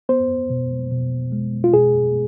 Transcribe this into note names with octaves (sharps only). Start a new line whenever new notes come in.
B3 C5
B2
B2
G#3
F4
B2 G#4